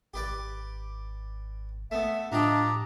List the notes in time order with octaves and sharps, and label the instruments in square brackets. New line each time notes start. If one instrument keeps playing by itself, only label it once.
[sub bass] G#1 [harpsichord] G4 B4 D5
[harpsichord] A3 B3 [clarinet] E5
[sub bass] A2 [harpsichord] F3 D#4 G5 [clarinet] D4 [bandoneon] G4 A#5